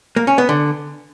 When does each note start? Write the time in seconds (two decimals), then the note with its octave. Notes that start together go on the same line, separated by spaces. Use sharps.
0.16 A#3
0.27 C#4
0.38 B3
0.49 D3